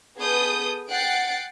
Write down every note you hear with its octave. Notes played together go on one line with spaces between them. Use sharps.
B3 G#4 A4 B4 D#6 G6
F#5 G5 F#6 A6 C7 D7